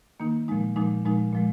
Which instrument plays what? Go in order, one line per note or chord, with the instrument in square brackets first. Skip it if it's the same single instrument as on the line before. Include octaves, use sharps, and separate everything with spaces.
[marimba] D#3 A#3 D#4
A#2 F3 G#3 D#4
A#2 F3 G#3 D#4
A#2 F3 G#3 D#4
A#2 F3 G#3